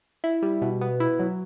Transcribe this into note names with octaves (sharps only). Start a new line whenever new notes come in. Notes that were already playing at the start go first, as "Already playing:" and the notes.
E4
G3
B2
B3
E4
F#3